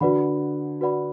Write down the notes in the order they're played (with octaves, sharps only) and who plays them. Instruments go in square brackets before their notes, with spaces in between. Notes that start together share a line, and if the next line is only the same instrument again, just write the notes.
[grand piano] D3 [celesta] F#4 B4 D5 F#5 B5
[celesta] F#4 B4 D5 F#5 B5